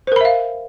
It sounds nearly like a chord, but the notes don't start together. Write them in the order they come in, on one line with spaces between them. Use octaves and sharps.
C5 A#4 B5 E5 F5